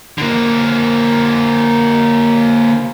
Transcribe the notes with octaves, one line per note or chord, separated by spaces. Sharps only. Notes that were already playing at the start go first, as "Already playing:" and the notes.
D3 A#3